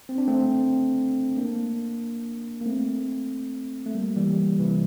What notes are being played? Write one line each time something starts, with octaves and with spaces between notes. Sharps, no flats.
C4
D4
A3 C4
A#3 D4
A#3
A3 C4
A3
G3 A#3
E3 G3
C3 E3